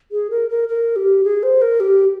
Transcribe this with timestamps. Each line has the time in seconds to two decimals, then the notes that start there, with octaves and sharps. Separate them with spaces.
0.12 G#4
0.30 A#4
0.50 A#4
0.68 A#4
0.96 G4
1.24 G#4
1.43 C5
1.62 A#4
1.80 G4